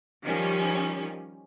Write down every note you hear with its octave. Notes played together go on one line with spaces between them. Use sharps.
D#3 F3 G3 C#4